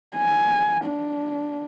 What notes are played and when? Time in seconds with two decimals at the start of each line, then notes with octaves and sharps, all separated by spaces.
0.16 G#5
0.85 D4